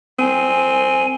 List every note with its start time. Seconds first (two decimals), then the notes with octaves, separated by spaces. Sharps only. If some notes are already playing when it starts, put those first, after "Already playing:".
0.19 C4 G#5